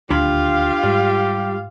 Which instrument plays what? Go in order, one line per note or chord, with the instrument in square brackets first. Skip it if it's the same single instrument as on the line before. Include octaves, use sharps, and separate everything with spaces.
[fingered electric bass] D#1 D2 [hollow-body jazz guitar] D4 B5 C6 [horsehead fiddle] F4 F5 [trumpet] G4
[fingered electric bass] G#2 [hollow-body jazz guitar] G3